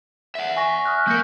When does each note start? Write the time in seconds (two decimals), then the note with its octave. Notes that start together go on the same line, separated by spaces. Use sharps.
0.35 E5 F#5
0.56 G#5 C#6 A#6
0.85 D#6 F6 F#6
1.07 A#3 A#4 G6 B6 C#7